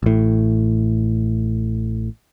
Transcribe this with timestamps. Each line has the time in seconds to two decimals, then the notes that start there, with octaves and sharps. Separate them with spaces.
0.03 A1 A2